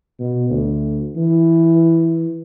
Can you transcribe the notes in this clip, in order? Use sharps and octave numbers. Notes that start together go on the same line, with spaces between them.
B2
D2
E3